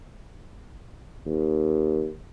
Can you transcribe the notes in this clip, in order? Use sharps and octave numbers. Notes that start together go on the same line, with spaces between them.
D#2